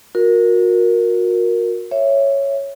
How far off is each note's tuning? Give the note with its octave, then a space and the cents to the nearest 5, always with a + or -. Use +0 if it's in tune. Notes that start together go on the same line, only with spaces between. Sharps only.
F#4 -30 A#4 +0
C#5 +0 E5 +10